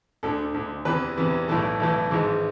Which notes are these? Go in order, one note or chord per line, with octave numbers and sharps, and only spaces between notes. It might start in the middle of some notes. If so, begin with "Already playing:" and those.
D2 D3 A4
D2 D3
E2 C3 E3 B4
E2 C3 E3
B1 A2 E3 A4
B1 A2 E3
G#1 G#2 E3